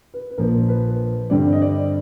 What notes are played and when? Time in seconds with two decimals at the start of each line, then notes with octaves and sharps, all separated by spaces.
0.14 B4
0.31 B4
0.38 A#1 A#2 F3 A#4
0.69 B4
1.30 G2 D3 G3 C4 D5
1.53 D#5
1.62 D5